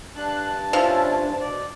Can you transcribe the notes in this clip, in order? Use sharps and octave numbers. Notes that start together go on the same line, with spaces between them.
G2 D4 A5 F#6
F3 C#4 D4 E4 F4
B2 D5